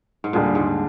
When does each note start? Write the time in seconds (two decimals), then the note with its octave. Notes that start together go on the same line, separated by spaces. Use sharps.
0.24 G#2
0.33 D#2 A#2 D3 G3 D4 G#4
0.55 G#2